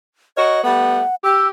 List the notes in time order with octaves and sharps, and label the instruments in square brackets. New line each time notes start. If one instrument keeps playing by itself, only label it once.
[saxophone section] F#4 A#4 C#5 [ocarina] D#5
[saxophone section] G3 A3 B3 [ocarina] F#5
[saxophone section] G4 [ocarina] E6